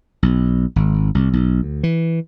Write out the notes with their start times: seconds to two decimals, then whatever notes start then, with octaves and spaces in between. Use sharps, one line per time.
0.23 B1
0.76 G#1
1.15 C2
1.33 B1
1.63 D2
1.83 E3